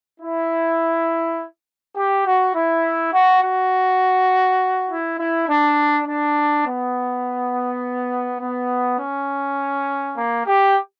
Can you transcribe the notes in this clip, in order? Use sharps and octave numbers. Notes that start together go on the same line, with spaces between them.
E4
G4
F#4
E4
F#4
F#4
E4
E4
D4
D4
B3
B3
C#4
A#3
G4